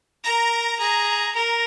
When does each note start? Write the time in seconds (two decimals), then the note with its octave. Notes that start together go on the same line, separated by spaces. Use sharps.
0.24 A#4 A#5
0.80 G#4 A#5
1.35 A#4 A#5